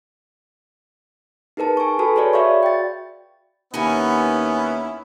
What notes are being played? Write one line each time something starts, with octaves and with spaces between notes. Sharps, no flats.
D#4 G#4 A#4 B4 A5
G#5 C#6
F#4 A4 B4 G#5 A5 B5
G#4 B4 C#5 D5
F#4 D5 E5 F5 B5 C#6
G5 A6
D#2 B3 C#4 D#4 E4 F#5 G#5